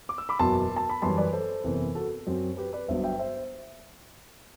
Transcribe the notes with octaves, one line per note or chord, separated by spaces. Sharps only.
D6
E6
B5 D6
F#1 E2 B2 F#3 A5 C6
A5
B5
F#2 E3 G3 A5 C6
B4 D5
A4 C5
F#1 E2 C3 E3
F#4 A4
F#2 F#3 C4
G4 B4
B4 D5
G1 G2 F#3 B3 C5 E5
E5 G5
C5 E5